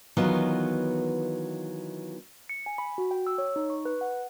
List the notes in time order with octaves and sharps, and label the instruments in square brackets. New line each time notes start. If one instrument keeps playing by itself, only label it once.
[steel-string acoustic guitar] D#3 E3 F#3 B3 F4 D#5
[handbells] C#7
G#5
B5
F#4
G5
E6
C#5
D#4
C#6
B4
F#5